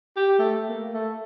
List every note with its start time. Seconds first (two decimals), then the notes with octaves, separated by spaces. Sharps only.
0.16 G4
0.39 A3
0.68 A#3
0.93 A3